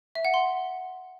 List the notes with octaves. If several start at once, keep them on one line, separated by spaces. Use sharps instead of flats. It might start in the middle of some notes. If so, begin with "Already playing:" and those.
E5
F#5
C6